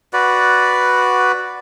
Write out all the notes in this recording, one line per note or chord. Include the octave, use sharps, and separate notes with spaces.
F#4 B4 D5